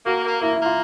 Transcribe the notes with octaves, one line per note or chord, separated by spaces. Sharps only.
A#3 F#4
A#3
A#3 E4
E4
A#3
F4